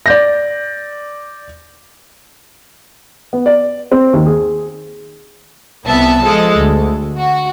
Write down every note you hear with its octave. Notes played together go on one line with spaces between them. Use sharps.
D5 G6 A#6
B3
D5
C4
D#2
G#4
C2 B3 E5 A5
F3 G#3 A4
D2
F#4